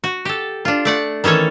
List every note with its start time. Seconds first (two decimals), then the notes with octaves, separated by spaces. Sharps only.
0.04 F#4
0.25 G4 A4
0.65 D4 F4
0.85 A3 D5 F#5
1.24 D#3 E3 C#4 A4 C#5